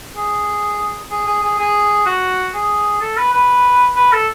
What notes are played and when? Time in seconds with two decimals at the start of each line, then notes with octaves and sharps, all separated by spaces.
0.16 G#4
1.11 G#4
1.27 G#4
1.43 G#4
1.59 G#4
2.06 F#4
2.54 G#4
3.01 A4
3.17 B4
3.33 B4
3.96 B4
4.13 A4